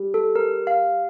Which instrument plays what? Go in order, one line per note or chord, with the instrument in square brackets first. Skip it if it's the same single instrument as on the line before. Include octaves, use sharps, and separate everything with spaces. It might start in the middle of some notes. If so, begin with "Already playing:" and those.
Already playing: [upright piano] G3
[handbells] A4
A#4
F5